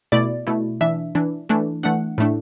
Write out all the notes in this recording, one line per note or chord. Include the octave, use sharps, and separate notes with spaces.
B2 A3 E4 D5
B2 A3 E4
E3 D4 E5
E3 D4
E3 A3 D4
E3 A3 D4 F#5
A2 A3 D4